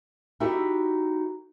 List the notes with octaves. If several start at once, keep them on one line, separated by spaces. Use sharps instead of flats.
D#4 E4 F#4 G4 A4 E5